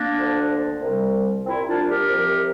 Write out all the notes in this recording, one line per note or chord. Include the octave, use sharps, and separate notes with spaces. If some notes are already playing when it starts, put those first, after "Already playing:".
Already playing: A#3 D4
D2 D3 F3
C2 C3 G3
C2 A#2 G3 C4 E4
D4 F4
G4 A#4
C2 C3 F3